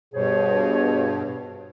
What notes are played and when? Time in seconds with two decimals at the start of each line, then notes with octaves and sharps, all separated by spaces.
0.14 G2 B2 G#4 C5 C#5